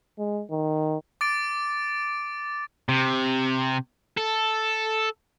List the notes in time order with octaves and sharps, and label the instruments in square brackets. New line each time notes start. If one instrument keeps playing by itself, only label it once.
[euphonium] G#3
D#3
[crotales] D6 A6 D7
[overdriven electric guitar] C3
A4